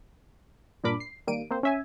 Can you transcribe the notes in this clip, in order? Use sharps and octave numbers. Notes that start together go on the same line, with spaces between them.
G2 A#2 D4 A#4 B5 D6
C7
D#3 G3 A#3 D7 D#7
A#3 C4 C5
C#4 E5 G#5